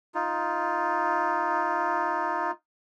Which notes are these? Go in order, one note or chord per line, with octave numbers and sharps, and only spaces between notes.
D#4 F4